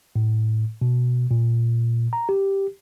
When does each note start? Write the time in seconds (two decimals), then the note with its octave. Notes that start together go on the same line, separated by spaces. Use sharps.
0.16 A2
0.82 B2
1.31 A#2
2.13 A#5
2.29 G4